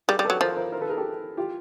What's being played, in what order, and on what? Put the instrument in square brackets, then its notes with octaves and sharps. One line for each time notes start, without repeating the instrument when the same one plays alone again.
[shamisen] G3 [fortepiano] G#4 A#4
[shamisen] G3
[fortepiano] A4 B4
[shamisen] F#3
[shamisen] F3 [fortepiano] A#4 C5
[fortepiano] A#4 C5
A#4 C5
A4 B4
G#4 A#4
G4 A4
F4 G4